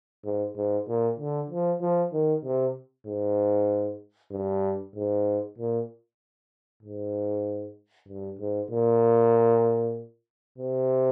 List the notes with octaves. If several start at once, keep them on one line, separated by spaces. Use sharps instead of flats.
G#2
G#2
A#2
D3
F3
F3
D#3
C3
G#2
G2
G#2
A#2
G#2
G2
G#2
A#2
C3